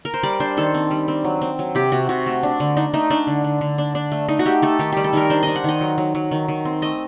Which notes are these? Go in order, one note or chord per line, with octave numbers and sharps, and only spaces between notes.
A#4
C5
G3 D5
D4 C5
D#3 A4
C4
G3
C4
F#3
C4
F#3
C3 G4
C3 F#4
C3 F#4
A3
D4
D3
D4 D#4
A3 D#4
A3 D4
D3
D3
D3
D4
D4
A3
A3 D#4
F#4
A3 G4
A3 A4
D#3 G4
G3 G4
A4
D#3 A#4
D4 C5
D4 D#5
F#5
D#3 D#5
F#3
F#3
F#3
D#3
D#3
C4
A3 D#5